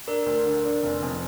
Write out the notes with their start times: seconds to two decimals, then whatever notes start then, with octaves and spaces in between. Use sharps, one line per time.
0.07 D4 A#4
0.26 D2
0.45 D3
0.64 D4
0.83 F1
1.03 F2